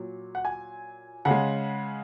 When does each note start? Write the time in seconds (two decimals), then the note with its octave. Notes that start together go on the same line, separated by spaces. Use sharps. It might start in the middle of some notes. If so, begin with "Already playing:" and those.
Already playing: A#2 F#3
0.35 F#5
0.45 G#5
1.25 C#3 F#5
1.31 G#3